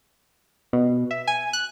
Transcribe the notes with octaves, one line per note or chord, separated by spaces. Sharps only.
B2
E5
G#5
F#6